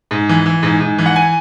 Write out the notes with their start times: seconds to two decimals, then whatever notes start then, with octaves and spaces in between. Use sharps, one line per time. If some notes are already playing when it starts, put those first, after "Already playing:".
0.11 G#2
0.29 E3
0.46 E3
0.63 G#2
0.81 G#2
0.98 E3
1.06 F#5
1.16 G#5